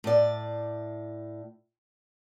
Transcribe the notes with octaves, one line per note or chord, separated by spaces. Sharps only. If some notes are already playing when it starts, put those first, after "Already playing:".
A2 D5